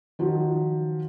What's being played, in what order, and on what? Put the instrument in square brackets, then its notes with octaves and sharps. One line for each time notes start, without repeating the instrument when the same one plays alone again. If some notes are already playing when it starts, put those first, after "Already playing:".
[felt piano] D#3 F3 F#3